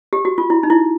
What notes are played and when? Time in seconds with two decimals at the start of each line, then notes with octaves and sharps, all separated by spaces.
0.13 G4
0.25 F#4
0.38 F4
0.50 E4
0.63 D#4
0.70 E4